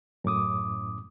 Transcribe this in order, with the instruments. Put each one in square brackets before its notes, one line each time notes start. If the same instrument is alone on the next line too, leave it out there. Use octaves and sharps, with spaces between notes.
[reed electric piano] F#2 A2 D6 D#6